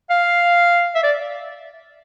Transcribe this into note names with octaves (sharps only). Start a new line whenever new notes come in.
F5
E5
D5